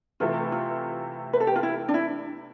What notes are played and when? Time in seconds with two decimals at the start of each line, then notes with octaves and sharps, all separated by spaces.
0.20 C3 E3 A3 E4 F4
0.52 F4
1.33 B4
1.40 A4
1.47 G4
1.56 F4
1.63 E4
1.89 D4
1.94 E4